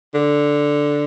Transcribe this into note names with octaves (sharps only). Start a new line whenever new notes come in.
D3